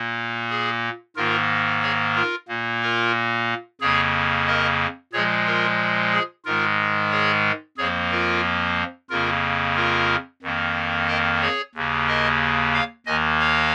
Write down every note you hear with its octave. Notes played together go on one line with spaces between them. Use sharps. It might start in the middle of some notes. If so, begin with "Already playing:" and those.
Already playing: A#2 A#3
G#4
G#2 D#3 A#3 F4 A#4
G#4 C#5
F4 A#4
A#2 A#3
F4 A#4
F2 C#3 A#3 G#4 C#5
A#4 D#5
A#2 F3 G#3 G#4 C#5
F4 A#4
G#4
G#2 D#3 G#3 F4 A#4
G#4 C#5
F2 F3 A#3 G#4 C#5
F4 A#4
F2 C#3 A#3 F4 A#4
F4 A#4
F2 D#3 A#3
A#4 D#5
G#4 C#5
D#2 C#3 A#3
A#4 D#5
C#5 F5
D#2 D#3 A#3 D#5 G#5
C#5 F5